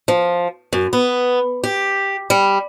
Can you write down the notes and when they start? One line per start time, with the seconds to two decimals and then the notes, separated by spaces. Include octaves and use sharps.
0.08 F3
0.73 F#2
0.93 B3
1.64 G4
2.30 G3